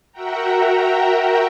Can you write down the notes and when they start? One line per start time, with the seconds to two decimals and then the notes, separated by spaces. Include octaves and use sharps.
0.12 F#4 A#4 E5 F#5 G5 A#5